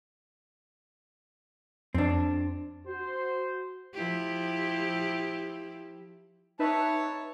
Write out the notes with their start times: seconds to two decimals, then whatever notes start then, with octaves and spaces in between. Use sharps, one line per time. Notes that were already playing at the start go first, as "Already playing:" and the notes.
1.94 F2 C4 D4
2.86 F#4 C5
3.94 F3 E4 G4
6.59 D#4 B4 C#5 E5 A5